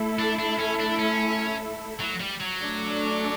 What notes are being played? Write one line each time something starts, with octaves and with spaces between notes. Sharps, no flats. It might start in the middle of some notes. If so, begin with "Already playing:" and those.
Already playing: A3 E4 A4
D4
D4
C#4
D4
C#4
F#3
G3
F#3
A3 D4 A4 D5